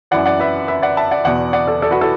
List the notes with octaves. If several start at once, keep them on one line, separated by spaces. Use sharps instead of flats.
F#2 E3 D5 F#5
D5 F#5
B4 E5
B4 E5
D5 F#5
E5 A5
D5 F#5
E2 B2 D5 F#5
D5 F#5
A4 D5
A4 D5
F#4 B4
E4 A4